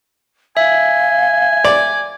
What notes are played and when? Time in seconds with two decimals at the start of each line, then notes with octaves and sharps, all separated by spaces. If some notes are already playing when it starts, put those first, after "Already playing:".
0.57 E5 F5 G#5
1.64 D5